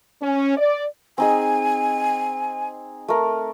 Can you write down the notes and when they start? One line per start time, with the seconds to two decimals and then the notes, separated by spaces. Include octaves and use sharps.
0.22 C#4
0.57 D5
1.18 C4 D#4 G#4 G#5
3.08 A3 A#4